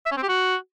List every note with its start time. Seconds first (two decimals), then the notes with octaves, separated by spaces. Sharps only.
0.06 E5
0.12 C#4
0.17 C4
0.23 G4
0.29 F#4